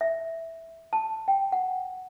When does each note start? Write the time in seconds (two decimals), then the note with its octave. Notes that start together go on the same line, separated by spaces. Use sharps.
0.01 E5
0.93 A5
1.28 G5
1.52 F#5